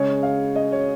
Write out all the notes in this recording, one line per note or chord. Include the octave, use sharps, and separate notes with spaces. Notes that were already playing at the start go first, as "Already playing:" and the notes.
Already playing: C#3 G#3 C#5
F5
D#5
C#5